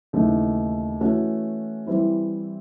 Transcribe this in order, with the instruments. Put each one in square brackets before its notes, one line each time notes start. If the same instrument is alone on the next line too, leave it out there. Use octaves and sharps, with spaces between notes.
[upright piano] D#2 C#3 E3 A3
E3 A3 C#4 F#4
E3 G3 C4 E4